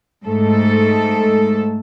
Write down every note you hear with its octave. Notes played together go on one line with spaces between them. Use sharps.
G#2 A3 A4